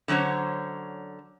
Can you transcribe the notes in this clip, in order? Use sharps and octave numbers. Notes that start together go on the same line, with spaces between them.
D3 F#3 C#4 C5 C#5